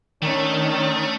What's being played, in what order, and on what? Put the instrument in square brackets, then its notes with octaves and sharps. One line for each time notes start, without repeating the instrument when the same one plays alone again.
[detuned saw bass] D#3 [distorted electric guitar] A3 [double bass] C#4 D4